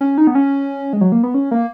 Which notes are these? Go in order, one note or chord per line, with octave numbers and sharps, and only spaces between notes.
C#4
D#4
B3
C#4
G#3
F#3
A#3
B3
C#4
A#3